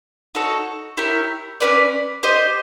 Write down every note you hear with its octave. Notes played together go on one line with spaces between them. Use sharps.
D#4 F#4 A4 C#5
E4 G4 A#4 C#5
C#4 F#4 B4 D5
G4 C5 D#5